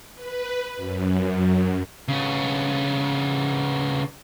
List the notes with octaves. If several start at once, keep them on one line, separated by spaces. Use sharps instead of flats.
B4
F#2
C#3 B3